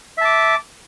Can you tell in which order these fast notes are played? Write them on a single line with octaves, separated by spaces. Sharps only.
E5 A5 D6